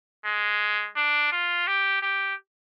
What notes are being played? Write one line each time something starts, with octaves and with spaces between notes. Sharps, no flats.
G#3
D4
F4
G4
G4